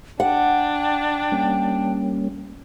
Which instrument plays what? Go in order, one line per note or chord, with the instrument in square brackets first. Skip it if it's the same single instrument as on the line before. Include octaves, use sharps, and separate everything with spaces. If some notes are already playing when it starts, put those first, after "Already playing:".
[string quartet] D4 [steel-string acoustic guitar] F#5 [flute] G5
[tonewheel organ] G3 A#3 C#4